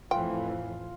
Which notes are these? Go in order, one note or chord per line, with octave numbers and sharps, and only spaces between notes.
F2 A2 E3 F4 G5